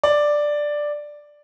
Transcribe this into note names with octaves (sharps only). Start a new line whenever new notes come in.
D5